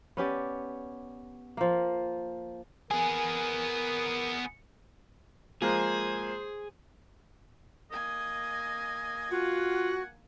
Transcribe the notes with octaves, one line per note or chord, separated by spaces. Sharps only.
B3 C#4 G4 D5
F3 A#3
B3 G#4 A#4 G#5
F3 G#3 A#3 G#4 C5
A#3 D#5 G#5
F4 F#4 F#5